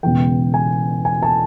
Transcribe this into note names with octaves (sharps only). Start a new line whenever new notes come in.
E1 E2 C#3 E3 G5
G#5
G#5
A5